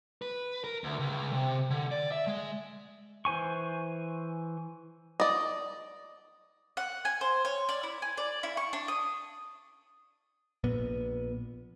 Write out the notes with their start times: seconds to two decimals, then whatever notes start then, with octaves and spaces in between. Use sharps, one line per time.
0.22 B4
0.64 A#4
0.84 D2
0.99 C#2
1.33 C3
1.70 D3
1.91 D5
2.12 E5
2.27 G#3
3.25 E3 C5 G#5 C#6
5.20 D5 D#5
6.77 F#5
7.05 G#5
7.21 C5
7.45 C#5
7.69 D5
7.83 E4
8.02 G#5
8.17 D5
8.43 E4
8.57 C#6
8.73 D4
8.88 D#6
10.64 A#1 A#2 B3